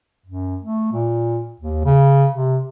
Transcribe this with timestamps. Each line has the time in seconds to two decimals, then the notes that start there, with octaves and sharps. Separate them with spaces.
0.26 F#2
0.62 A3
0.93 A#2
1.60 D#2
1.85 C#3
2.34 C3